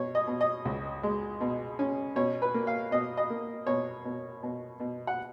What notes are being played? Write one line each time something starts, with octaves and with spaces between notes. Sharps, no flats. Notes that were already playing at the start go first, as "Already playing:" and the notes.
Already playing: B2 C#5
D#5
B2
D#5
C#2
G#3
B2
C#4
B2 C#5
B4
A#3
F5
B2 D#5
D#5
A#3
B2 C#5
B2
B2
B2
F#5